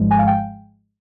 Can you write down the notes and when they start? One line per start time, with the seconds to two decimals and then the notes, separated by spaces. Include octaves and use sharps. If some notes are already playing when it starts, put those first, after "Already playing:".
Already playing: G#1 G#2 F3 G#3
0.11 G#5
0.19 F5
0.27 G5